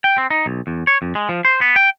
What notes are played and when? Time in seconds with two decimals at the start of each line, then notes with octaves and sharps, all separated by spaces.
0.04 G5
0.18 C4
0.30 D#4
0.46 B1
0.67 E2
0.87 C#5
1.02 F2
1.15 G#3
1.29 F3
1.45 C5
1.61 B3
1.76 G5